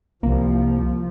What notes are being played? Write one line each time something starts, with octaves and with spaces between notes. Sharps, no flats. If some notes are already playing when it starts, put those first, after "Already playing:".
C2 F3 A#3